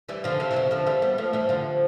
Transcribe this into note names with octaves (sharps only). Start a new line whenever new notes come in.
E3 G3
D3 F3
C3 E3
E3
B2 D3
D3 F3
E3 G3
G3 B3
F3 A3
E3 G3
D3 F3